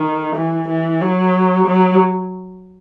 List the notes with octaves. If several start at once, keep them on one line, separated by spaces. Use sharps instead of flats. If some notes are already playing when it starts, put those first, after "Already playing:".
Already playing: D#3
E3
E3
F#3
F#3